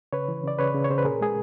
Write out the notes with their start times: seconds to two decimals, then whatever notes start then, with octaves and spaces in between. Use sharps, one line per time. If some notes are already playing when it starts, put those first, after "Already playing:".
0.13 C#3 B4 C#5
0.28 E3
0.44 C#3 D5
0.59 C#3 B4 C#5
0.75 C#3
0.84 C#5
0.90 C#3 C5
0.98 B4
1.05 A#2 G#4 A#4
1.21 G#3 G#4